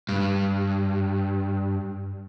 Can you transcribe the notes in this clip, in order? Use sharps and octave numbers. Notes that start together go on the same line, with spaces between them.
G2